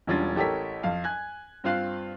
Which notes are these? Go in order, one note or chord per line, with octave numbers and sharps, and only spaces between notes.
E1 G3 C#4 D4 F4 A6
A1 G4 A4 A#4 C#5 B6
F2 F5
G#5 F#6 G#6
G2 C4 F4 F5 F#6 C7